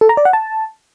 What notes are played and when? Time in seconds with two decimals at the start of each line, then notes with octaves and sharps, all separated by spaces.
0.01 A4
0.09 A#5
0.17 D5
0.25 F#5
0.33 A5